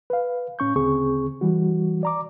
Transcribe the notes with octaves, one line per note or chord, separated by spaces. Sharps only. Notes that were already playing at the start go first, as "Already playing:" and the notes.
B4 F5
A2 C#4 C#6 G6
D2 C#3 C4 G#4 C#6
E3 G3 F#4
D5 A#5 D6